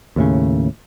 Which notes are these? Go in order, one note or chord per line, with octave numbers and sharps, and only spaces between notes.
D#2 A2 C#3